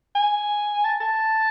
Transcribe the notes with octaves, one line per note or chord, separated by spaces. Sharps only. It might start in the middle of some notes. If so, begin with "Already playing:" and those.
G#5
A5
A5